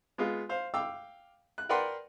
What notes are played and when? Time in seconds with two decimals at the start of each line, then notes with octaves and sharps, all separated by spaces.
0.18 G#3 B3 F4
0.49 C5 F5
0.74 F5 G5 D6 E6
1.58 F#6
1.69 A#4 B4 D5 F#5 G5 C6